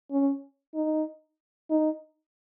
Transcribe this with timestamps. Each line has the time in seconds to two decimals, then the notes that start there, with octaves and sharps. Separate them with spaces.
0.11 C#4
0.75 D#4
1.71 D#4